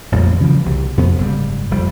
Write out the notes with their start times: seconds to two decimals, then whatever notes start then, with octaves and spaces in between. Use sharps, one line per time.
0.12 A1 F2 A#2 G3
0.40 C#3 E3 F3 G3
0.63 C2 B2
0.97 F2 C3 B3
1.18 F#1 G#2 G3
1.71 F1 G3